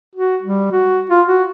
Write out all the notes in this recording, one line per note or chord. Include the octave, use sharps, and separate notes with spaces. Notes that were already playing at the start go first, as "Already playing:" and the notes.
F#4
G3
F#4
F4
F#4